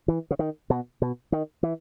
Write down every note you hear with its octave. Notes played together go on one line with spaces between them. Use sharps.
E3
C#3
D#3
B2
B2
D#3
E3